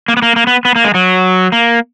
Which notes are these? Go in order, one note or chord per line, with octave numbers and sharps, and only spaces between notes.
A#3
B3
A#3
A#3
B3
B3
A#3
G#3
F#3
A#3